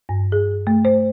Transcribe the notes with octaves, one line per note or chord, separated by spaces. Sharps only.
G2
G#4
A3
C5